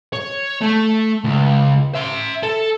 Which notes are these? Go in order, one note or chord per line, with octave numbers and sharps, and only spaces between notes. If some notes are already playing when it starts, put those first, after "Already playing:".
C#5
A3
C#2
E5 C6
A4